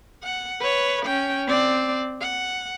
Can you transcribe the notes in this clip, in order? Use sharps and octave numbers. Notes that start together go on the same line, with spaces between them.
F#5
B4 C#5
C#4 G5
C4 D5
F#5